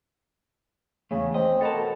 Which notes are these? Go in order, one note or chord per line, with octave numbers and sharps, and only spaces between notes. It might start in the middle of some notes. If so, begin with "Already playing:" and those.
E2 C#3 A3
C4 D#5
B2 A4 A#4 A5